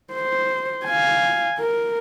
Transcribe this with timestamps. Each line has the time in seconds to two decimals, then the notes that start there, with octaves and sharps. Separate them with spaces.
0.13 C5
0.85 F5 G#5
1.58 A#4